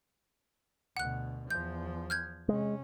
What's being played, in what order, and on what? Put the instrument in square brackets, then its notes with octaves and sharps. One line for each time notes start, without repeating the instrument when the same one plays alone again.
[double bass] D2 B2 [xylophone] F#5 F#6
[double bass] E2 F3 [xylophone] G6
[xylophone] F6 G6 G#6
[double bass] C3 C#4 [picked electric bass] G#3